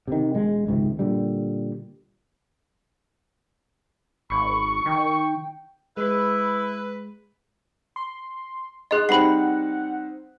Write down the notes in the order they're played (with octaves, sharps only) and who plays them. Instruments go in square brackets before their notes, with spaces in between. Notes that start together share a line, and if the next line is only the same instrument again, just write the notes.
[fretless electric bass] C3 D#3
E1 G#3
G#1 C#2 C3 D#3
A#2 D3 G3
[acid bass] G#1 [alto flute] B5 [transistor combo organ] C#6
[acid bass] D#3 [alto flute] G5
[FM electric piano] G#3 [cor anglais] E4 [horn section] B4
[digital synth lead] C6
[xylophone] G#4 D#5 [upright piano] C6 F#6
[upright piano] G3 C4 D#4 [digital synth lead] F#5 [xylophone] B5 C7